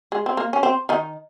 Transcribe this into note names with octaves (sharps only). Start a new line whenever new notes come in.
G#3
C4
A#3
C#4
C4
D#3 D#4